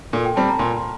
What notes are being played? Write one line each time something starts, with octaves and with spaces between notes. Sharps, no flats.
A#2 A4
G5
G3 C4 A5
A#5
A#2 C6